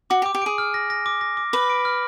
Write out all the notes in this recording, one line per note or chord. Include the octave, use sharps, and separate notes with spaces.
F#4 D6
G4
D6
G4
G#4 D7
F6
A#6
A#6
D6
A#6
D6
B4 D6
D7
F6